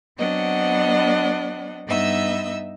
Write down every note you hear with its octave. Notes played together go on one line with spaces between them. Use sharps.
F#3 B3 C4 D4 D#5 F#5
G2 B3 D#4 D#5 E5 E6